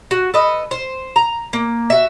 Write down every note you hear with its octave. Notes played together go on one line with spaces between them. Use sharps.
F#4
A4 B4 D#5
C5
A#5
A#3
F#4 E5